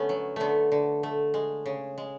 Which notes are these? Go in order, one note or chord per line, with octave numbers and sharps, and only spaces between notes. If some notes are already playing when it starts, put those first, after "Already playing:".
Already playing: D3 A3 B3 C#4
F#3
D3 A3 B3
D3
A3
G#3
C#3
G#3